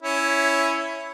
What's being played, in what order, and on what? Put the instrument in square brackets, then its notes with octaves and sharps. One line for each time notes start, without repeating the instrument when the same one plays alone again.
[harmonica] C#4 E4